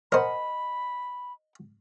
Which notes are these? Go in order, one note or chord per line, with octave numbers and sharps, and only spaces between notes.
A#4 C5 D#5 F#5 G#5 B5